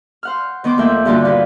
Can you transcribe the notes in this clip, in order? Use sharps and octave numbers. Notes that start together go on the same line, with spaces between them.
C5 F#5 F6
D#3 B3 C5 D6
F2 A3 A#3 E5 G5
G2 A#2 D3 A#3 F4 F#4
D#2 F4 B4